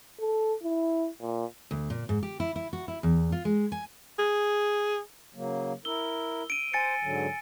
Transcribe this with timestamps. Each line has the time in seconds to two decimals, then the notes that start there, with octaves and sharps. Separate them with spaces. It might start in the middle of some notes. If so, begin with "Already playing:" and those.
0.20 A4
0.63 E4
1.21 A#2
1.71 D2
1.90 A#2
2.09 G#2
2.23 G4
2.40 E4
2.56 E4
2.73 F#4
2.88 E4
3.03 E2
3.32 F4
3.45 G#3
3.72 G#5
4.19 G#4
5.35 C#3 F#3 A#3
5.85 E4 A#4 E6 G7
6.50 D7 D#7
6.73 C5 G#5 A6 C#7
7.02 G#2 D3 F#3